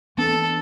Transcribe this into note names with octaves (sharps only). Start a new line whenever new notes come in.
E3 B3 D4 A4